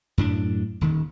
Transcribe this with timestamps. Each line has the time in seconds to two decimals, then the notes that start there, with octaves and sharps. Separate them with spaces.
0.18 F#2 A2 D4
0.81 D#1 D#3